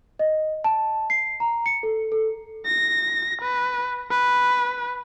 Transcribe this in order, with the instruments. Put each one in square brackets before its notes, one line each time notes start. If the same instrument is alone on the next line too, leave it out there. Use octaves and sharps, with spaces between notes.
[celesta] D#5
A5
C7
A#5
C#7
A4
A4
[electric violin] A#6
B4
B4